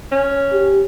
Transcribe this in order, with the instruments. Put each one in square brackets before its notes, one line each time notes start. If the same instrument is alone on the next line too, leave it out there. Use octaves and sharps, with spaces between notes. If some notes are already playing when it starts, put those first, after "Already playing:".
[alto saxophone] C#4
[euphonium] G4